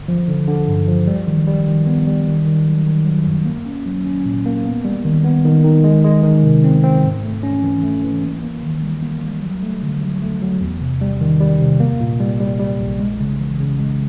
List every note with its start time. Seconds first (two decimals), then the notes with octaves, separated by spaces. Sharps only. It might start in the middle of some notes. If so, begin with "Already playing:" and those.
Already playing: G1
0.08 F3
0.28 D3
0.47 D3
0.68 G2
0.87 F3
1.07 G3
1.27 D#3
1.48 G3
1.67 D#3
1.87 B3
2.07 G3
2.27 D#3
2.47 D#3
2.66 F#3
2.87 D#3
3.06 F#3
3.26 F#2
3.45 A#3
3.66 C#4
3.85 F#3
4.06 C#4
4.25 A#2
4.46 A#3
4.65 B3
4.85 G3
5.05 D#3
5.24 B3
5.45 D#3
5.64 D#3
5.84 G#3
6.04 G#3
6.23 D#3
6.43 C3
6.64 C4
6.84 C4
7.04 G#2
7.23 A3
7.43 C#4
7.63 E3
7.83 A3
8.03 E3
8.22 A#3
8.43 A#3
8.63 D#3
8.82 G3
9.03 A#3
9.23 G3
9.42 F#3
9.62 A3
9.82 D3
10.02 F#3
10.22 A3
10.42 F#3
10.61 E2
10.81 C3
11.01 G3
11.21 D#3
11.41 G3
11.61 C3
11.80 A#3
12.00 A#2
12.20 G3
12.40 G3
12.60 G3
12.80 A#1
13.00 G#3
13.20 C#3
13.40 E3
13.60 C#3
13.80 G#3